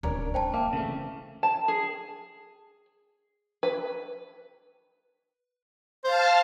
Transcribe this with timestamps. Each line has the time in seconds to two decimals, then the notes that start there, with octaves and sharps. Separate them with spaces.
0.03 D1 C#4 D4 A#4
0.34 G#3 C4 C5 G5 A5
0.54 A#3 E5
0.73 C#3 E3 A3
1.43 A5
1.68 G#4
3.63 B4
6.04 C5 F5 A5 F6